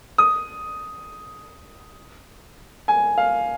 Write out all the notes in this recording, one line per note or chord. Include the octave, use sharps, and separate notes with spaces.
D#6
G#5
F5